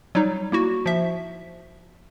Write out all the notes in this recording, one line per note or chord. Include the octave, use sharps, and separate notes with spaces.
F#3 G3 D#4
A#3 E4 F#4
F3 E5